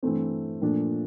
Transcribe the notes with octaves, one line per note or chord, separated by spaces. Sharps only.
G2 E3 A3 C4
A#2 F3 A3 D4